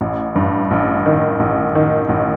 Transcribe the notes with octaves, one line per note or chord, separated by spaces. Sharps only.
A1
G2
A1
D#3
A1
D#3
A1